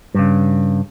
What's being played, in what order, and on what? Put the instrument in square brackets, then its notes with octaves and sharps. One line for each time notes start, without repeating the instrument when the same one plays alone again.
[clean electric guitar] G2 C#3